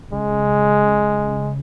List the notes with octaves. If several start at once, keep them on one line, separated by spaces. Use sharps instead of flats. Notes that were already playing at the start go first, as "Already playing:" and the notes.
C#3 G#3